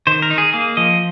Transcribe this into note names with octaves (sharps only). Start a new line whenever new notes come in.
D#3 C5
A#4
D#4
G#4
A#3 G#4
F3 D#5